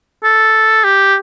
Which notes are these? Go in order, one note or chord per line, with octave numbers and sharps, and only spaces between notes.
A4
G4